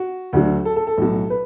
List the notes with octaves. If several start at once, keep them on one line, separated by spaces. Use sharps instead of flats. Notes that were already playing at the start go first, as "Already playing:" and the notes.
Already playing: F#4
D2 D3 F#3
A4
A4
A4
B1 A2 F#3
B4